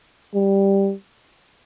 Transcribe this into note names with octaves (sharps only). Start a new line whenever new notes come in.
G3